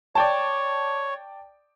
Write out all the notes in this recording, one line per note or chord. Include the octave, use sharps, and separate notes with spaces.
C#5 D5 G5 A5